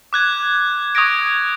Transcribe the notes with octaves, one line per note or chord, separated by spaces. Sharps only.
D6 F#6 G#6
C#6 D#6 F#6 G#6 A#6 D7